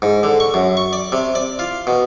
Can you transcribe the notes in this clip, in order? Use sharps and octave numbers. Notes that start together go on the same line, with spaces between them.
G#2
D3
C#6
F#2
C#6
D5
C3
D5
F4
B2